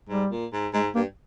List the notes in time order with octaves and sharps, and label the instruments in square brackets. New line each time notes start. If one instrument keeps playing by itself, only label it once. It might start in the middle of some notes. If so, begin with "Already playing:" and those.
[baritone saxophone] G#2 [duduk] G3
[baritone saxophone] A#2
G#2
[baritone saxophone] G#2 [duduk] G#3
[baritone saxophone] G2 [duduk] A#3